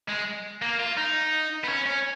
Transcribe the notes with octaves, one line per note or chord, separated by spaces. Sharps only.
G#3
A#3
F4
D#4
B3
C#4
C#4